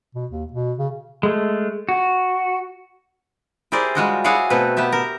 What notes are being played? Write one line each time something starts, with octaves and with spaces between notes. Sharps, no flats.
B2
D#2
B2
C#3
G#3 A3
F#4
E4 G4 G#4 A#4 C5 D5
G3 G#3 F4 F#4 D5 D#5
E4 F#4 G#4 C#5 D5 F5
B2 A3 C4 B4
B3 G4 E5 A5
A#4